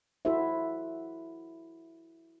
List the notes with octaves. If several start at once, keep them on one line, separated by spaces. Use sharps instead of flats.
E4 F#4 A4 C5 E5